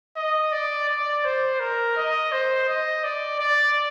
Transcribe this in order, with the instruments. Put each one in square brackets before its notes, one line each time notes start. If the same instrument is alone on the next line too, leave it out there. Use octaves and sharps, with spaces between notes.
[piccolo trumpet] D#5
D5
D5
C5
A#4
D#5
C5
D#5
D5
D5